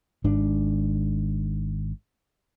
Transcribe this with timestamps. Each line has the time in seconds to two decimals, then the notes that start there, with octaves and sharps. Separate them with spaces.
0.24 G#1 G#2 D4